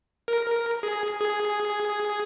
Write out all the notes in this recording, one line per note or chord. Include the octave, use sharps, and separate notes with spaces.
A#4
A#4
G#4
G#4